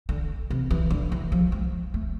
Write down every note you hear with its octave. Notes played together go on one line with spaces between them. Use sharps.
D3
C3
E3
D3
E3
F3
G#3
A3